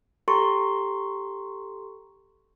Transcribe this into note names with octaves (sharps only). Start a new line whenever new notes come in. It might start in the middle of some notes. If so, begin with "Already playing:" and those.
G4 A4 A#5 C6 C#6